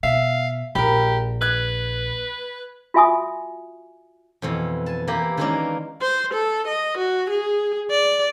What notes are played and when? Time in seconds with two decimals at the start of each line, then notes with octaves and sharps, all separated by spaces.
0.03 B2 E5 F5
0.75 A#1 G4 A#4 B5
1.42 B4 F#6 G#6
2.94 F4 F#4 E5 G#5 C#6 D#6
4.42 F2 B2 E3
4.86 G#5 A5
5.07 E3 A#3 E4 G4
5.37 D#3 E3 G#3 A#3 C#4 D4
6.02 C5
6.34 A4
6.67 D#5
6.98 F#4
7.30 G#4
7.90 D5